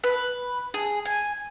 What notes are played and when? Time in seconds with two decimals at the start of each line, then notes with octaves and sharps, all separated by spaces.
0.04 B4
0.74 G#4
1.05 G#5